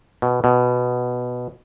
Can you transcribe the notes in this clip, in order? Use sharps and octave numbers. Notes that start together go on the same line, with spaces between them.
B2
B2